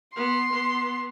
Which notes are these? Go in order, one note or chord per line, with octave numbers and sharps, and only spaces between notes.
B3 C6
B3